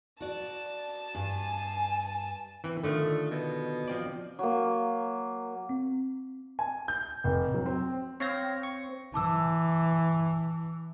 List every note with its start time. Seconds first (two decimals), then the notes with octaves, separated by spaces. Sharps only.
0.20 F#4 D5 A5
1.15 G2 G#5
2.64 E3 C4
2.83 D3 D#3 F3 A3
3.30 B2
3.88 F3 C4 D5
4.39 F#3 A#3
5.69 C4
6.59 G#5
6.88 G6
7.24 F1
7.54 F#3
7.66 C4
8.20 C4 C#5 F5 A#6
8.63 C#6
9.14 E3 A5 D6 E6